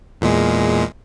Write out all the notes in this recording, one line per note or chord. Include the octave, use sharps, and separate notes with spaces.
E2 A#2 G#3